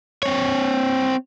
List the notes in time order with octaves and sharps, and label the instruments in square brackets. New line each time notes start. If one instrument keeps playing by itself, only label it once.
[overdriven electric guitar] C4 C#5